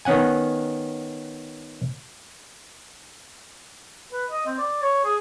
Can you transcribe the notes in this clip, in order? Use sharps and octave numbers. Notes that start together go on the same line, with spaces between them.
D#3 B3 C#4 F#5 G#5
B4
D#5
C4
D5
C#5
G#4